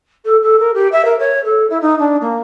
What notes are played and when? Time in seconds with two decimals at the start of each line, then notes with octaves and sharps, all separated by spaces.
0.25 A4
0.42 A4
0.59 A#4
0.74 G4
0.92 E5
1.05 A#4
1.19 C#5
1.44 A4
1.69 E4
1.81 D#4
1.99 D4
2.21 A#3